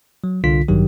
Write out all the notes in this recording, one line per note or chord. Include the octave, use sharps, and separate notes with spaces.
F#3
C2 D3 F4 B6
A1 G2 D#3 F#3 G4